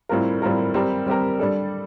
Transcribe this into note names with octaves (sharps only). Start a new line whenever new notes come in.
A2 G3 C4 F4 A#4
A2 G3 C4 F4 A#4
G3 C4 G4 A#4
G3 C4 G4 A#4
G3 D4 A4